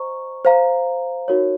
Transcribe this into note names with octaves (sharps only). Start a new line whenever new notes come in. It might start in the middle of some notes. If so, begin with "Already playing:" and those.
Already playing: C5 D#5 A#5 C#6
C5 F5 A#5
D#4 F#4 A#4 C#5